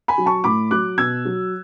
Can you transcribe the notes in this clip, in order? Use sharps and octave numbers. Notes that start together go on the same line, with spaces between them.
G#5 B5
F#3
A5 C#6
A2 B5 D6
F#3 D6 F#6
B2 E6 G#6
F#3